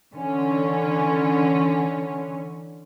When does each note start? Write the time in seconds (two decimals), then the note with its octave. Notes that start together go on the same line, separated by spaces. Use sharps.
0.15 D3 E3 C#4